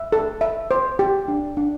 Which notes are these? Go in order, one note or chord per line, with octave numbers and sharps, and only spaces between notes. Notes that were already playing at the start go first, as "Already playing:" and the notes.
Already playing: E5
A4
E5
C5
G4
D4
D4